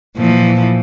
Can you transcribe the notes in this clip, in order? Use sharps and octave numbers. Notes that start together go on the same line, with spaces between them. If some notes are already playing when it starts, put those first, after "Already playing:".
A#2 E3 F3